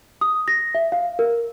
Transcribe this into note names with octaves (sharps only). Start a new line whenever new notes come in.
D#6
A#6
E5
F5
A#4